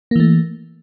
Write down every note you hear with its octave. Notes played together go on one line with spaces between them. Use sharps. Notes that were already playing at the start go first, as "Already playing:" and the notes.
E3 A3 A#3